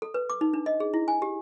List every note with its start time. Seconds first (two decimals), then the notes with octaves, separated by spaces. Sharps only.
0.02 A4
0.14 B4
0.30 D6
0.41 D#4
0.53 D4
0.66 D#5
0.80 G#4
0.94 E4
1.08 G#5
1.22 G4